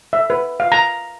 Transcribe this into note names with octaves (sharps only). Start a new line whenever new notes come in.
E5
B4
F5
A#5